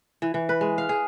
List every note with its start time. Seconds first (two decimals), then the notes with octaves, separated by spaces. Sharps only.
0.22 E3
0.34 E3
0.49 B4
0.61 G#3
0.78 F5
0.89 G#4